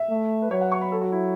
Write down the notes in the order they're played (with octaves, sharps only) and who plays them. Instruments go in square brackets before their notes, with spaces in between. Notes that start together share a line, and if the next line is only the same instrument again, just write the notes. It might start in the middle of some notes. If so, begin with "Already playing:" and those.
Already playing: [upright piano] E5
[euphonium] A3
[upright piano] B4
[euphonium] F#3 [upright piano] C#5
[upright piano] F#5
C#6
B5
A4
F#4
E4